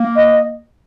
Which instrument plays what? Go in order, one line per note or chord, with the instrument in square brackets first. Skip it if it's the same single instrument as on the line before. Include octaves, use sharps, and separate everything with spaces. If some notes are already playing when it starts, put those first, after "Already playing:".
Already playing: [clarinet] A#3
[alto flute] D#5